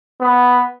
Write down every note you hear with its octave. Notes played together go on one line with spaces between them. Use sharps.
B3